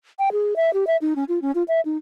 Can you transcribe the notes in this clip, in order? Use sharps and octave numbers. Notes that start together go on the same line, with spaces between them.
G5
G#4
E5
G4
E5
D#4
C#4
F4
C#4
F4
E5
D#4